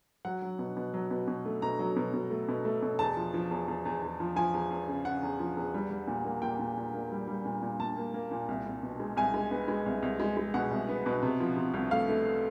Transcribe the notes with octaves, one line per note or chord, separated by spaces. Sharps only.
F#3 F#5
F#3
B2
B2
F#3
B2
B2
A3
B2 A#5
F#3
B2
B2
A3
B2
A3
B2
E2 A5
F3
F3
E2
E2
E2
E2
F3
F3 G#5
E2
E2
C#3
C#3 F#5
E2
F3
E2
G3
G3
A#2
A#3
A#2 G5
A#2
A#2
A#3
G3
G3
A#2
A#2
A#2 A5
A#3
A#3
A#2
C2
C2
B2
G#3
C2 G#5
G#3
B3
G#3
C2
C2
G#3
G#3
B2 F#5
C2
B3
B2
C3
F3
C3
C2
A3 F5
A3